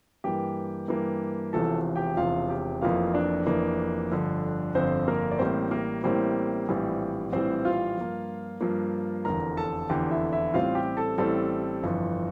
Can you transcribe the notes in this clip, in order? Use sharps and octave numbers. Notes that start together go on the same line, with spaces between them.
G2 E3 A#3 G4 G5
G2 E3 A#3
E1 E2 C3 F3 A4 A5
G4 G5
E1 E2 C3 F3 F4 F5
G4 G5
F1 F2 E3 A#3 F4 F5
D4 D5
F1 F2 E3 A#3
G1 F2 D3
G1 F2 D3 C4 C5
A#3 A#4
D5
A1 A2 G3 A#3 C4 C5
A#3 A#4
A1 A2 G3 A#3 C4 C5
A#1 A2 E3 G3
A#1 A2 E3 G3 C4 C5
F4 F5
G2 F3 A#3
G2 F3 A#3
F1 E2 D3 A#4 A#5
A4 A5
F1 E2 D3 G4 G5
E4 E5
E4 E5
A1 A2 G3 C4 F4 F5
G4 G5
A4 A5
A1 A2 G3 C4 A4 A5
G1 F2 E3